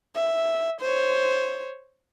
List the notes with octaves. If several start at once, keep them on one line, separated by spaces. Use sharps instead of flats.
E5
C5 C#5